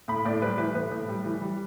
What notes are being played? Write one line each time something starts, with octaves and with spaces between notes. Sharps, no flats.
A2 B5
A2 D5
G3 B4
E3 B4
A2 B4
A2
G3
E3
G3